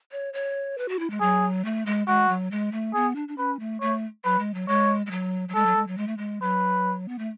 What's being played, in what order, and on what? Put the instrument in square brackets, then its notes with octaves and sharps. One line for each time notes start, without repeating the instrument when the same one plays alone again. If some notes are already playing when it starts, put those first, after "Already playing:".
[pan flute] C#5
C#5
B4
F#4
E4
G#3
[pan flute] F#3 [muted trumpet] G#4
[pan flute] A3
G#3
[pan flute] G#3 [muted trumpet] F#4
[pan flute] F#3
G#3
A3
[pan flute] B3 [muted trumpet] G#4
[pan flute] D4
D4
[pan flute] C#4 [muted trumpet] B4
[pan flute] A3
[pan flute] A3 [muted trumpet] C#5
[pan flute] F#3 [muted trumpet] B4
[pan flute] G#3
F#3
[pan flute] G#3 [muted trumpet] C#5
[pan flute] G#3
F#3
F#3
[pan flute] G#3 [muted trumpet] A4
[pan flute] F#3
G#3
F#3
G#3
A3
G#3
[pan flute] F#3 [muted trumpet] B4
[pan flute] B3
A3